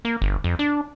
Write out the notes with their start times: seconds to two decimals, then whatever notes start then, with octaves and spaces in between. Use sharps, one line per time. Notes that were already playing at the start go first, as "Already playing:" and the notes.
0.05 A#3
0.22 G1
0.44 F2
0.59 D4